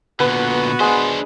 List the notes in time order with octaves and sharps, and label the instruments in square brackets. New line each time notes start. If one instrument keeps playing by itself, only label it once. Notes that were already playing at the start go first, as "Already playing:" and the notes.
[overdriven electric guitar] A#2 D3 [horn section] B3 F#4 [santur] B4
[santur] G#3 [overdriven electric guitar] D4 C5